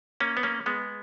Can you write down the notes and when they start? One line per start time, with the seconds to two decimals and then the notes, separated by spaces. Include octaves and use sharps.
0.20 A#3 C#4
0.37 B3
0.43 A#3 C#4
0.66 G#3 B3